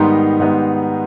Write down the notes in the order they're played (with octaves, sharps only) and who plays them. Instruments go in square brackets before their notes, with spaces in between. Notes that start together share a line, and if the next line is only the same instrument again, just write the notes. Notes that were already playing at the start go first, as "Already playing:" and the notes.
Already playing: [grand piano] G#2 D#3 G3 B3 D#4 A#5 C6
G#2 D#3 G3 B3 D#4